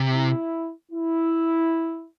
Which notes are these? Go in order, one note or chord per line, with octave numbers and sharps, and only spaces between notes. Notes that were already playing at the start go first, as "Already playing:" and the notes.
Already playing: C3
E4
E4